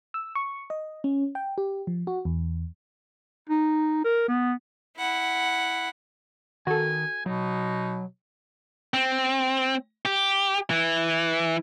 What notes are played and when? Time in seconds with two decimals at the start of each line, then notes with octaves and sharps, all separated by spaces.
0.14 E6
0.35 C#6
0.70 D#5
1.04 C#4
1.35 G5
1.58 G4
1.87 F3
2.07 F#4
2.25 E2
3.50 D#4
4.05 A#4
4.28 B3
4.97 E4 F#5
6.67 D#3 F#4 A4 G#5
7.26 B2 F#3 D#4
8.94 C4
10.05 G4
10.71 E3